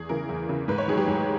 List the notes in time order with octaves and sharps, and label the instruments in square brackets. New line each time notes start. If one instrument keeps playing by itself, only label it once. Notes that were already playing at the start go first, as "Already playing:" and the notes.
Already playing: [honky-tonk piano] E2 G#4
C#3 E3 A#4
E2
C#3 E3
G#2 B4
C#5
D#3 F#3 G#4
G4
G#2